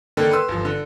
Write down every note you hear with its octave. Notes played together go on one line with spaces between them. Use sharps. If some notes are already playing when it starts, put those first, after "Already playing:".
D3 D#3 A#3 A4
B4 C6 E6
G1 F3
D3